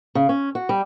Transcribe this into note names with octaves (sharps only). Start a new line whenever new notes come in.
C#3
C#4
F#4
G3